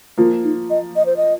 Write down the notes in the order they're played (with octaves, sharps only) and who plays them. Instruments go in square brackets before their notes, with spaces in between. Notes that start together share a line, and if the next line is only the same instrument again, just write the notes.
[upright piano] F3 A#3 [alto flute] F4
[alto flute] D#4
D#5
D#5
C5
D#5